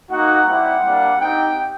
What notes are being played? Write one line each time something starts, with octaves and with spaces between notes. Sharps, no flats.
A#3 D#4 F#4 F#5
G3 C4 E4 G4 F#5
G3 A#3 D4
C4 D#4 G4 G5